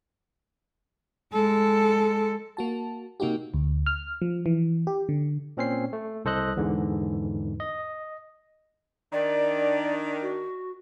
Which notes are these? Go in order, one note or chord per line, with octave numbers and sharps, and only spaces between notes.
G#3 A4
A#3 F#4 A5
C3 A#3 D#4 F#4 G4
D2
F6
F3
E3
G4
D3
A#2 C4 C#4 C5 C7
A3
C2 A4 C5 D#5 F#6
E2 G#2 D3 E3
D#5
D#3 D4 D5
F#4